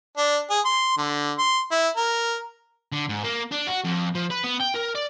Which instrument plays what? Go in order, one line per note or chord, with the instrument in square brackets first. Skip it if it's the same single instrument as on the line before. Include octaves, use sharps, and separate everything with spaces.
[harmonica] D4
G#4
C6
D3
C6
E4
A#4
[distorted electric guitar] D3
G#2
A#3
D4
F#4
F2
F3
B4
B3
G5
A#4
D5